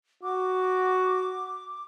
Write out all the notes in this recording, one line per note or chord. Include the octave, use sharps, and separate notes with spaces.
F#4 D6